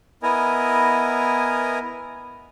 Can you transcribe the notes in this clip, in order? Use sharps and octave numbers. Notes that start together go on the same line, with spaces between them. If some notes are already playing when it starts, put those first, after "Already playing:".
B3 E4 A#4 D#5 G#5